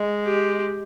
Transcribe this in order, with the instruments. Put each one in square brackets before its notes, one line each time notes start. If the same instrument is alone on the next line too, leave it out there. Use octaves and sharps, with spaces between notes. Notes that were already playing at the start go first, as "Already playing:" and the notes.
Already playing: [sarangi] G#3
[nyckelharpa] G4